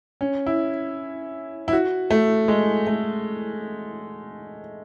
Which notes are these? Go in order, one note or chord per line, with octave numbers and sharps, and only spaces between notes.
C#4
E4
E4
F#4
A3
G#3
A3